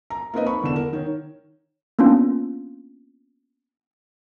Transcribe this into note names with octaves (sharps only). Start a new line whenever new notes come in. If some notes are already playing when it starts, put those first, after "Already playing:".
A#5
A#3 C4 D#4 B4 D#5
B5 C#6
E2 D3 E7
A#4
D#3 C#5
A#3 B3 C#4 D4 F4